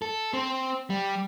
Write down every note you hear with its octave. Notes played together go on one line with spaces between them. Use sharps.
A4
C4
G3